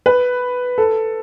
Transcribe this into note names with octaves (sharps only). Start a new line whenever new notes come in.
B4
A4